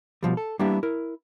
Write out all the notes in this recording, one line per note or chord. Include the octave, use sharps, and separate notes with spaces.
B2 F3 G3
A4
G3 A#3 B3 D4 E4 G4
E4 A#4